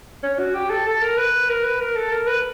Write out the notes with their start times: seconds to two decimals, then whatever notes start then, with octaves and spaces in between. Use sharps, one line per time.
0.23 C#4
0.39 F#4
0.54 G4
0.70 A4
0.86 A4
1.01 A#4
1.17 B4
1.49 A#4
1.64 B4
1.80 A#4
1.96 A4
2.12 A#4
2.27 B4